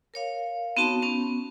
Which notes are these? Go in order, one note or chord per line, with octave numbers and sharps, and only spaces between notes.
A#4 C#5 F5
B3 C4 D#4 F#4 A5 C6
B3 C#4